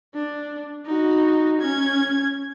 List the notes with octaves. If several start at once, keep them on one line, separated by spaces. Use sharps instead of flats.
D4
D#4 F#4
C#4 G#6